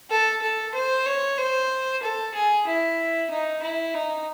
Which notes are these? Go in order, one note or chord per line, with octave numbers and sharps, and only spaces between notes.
A4
A4
C5
C#5
C5
A4
G#4
E4
D#4
E4
D#4